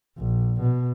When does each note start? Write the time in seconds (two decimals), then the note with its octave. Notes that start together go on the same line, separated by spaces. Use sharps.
0.18 A#1
0.61 B2